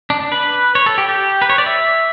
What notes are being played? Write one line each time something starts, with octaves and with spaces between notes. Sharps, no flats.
D4
D4
B4
C#5
A4
G4
G4
B4
C#5
D5
E5